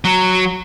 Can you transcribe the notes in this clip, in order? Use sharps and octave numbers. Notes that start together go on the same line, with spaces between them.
F#3